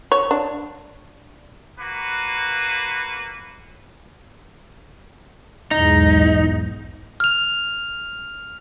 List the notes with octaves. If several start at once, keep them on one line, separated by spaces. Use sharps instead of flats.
C#5
D4
A#3 F#4 B4
B1 E2 G#2 D#4
F6 F7